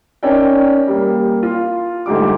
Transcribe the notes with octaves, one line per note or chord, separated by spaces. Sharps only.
C#4 D#4 A#4 D5 G5
G3 A#3
F4
D2 G#2 G3 D6